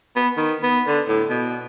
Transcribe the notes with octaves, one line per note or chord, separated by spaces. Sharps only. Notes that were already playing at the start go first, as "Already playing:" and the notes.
B3
D#3
B3
D3
A2
B2